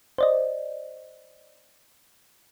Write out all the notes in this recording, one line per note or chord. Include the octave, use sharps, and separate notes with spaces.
C5 D5 D#5